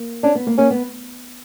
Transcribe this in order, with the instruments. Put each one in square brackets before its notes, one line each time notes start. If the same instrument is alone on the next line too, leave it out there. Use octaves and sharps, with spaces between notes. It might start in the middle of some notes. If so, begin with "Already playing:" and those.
Already playing: [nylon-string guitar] A#3
[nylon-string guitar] C#4 [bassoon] D4
[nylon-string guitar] B3
A#3
[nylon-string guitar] A#3 [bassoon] C#4
[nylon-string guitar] B3